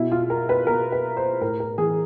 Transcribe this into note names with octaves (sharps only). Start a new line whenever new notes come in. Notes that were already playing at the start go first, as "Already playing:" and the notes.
Already playing: B2 E4
F4
A#4
B4
B2 A#4
B4
C5
A2 A#4
A#4
E3 G#4